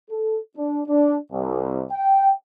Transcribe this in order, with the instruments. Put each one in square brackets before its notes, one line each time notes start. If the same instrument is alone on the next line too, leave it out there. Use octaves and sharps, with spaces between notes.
[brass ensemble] A4
D4
D4
C2
G5